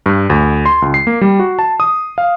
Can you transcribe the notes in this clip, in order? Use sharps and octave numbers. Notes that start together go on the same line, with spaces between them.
G2
D2
C6
C#2
C7
A#3
G3
F#4
A5
D#6
F5